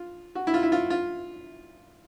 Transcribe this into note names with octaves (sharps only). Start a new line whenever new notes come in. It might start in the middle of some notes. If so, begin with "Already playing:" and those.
Already playing: F4
F#4
E4
F4
E4
F4
F4